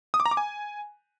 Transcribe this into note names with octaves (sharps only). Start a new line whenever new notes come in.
D#6
D6
A#5
D6
G#5